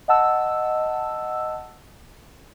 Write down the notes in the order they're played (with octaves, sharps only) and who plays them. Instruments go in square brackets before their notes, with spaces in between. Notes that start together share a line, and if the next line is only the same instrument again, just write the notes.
[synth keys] D#5 F#5 A5 E6